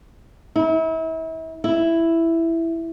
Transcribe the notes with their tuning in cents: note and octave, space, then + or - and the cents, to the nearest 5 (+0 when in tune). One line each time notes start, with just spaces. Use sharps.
E4 -35
E4 +5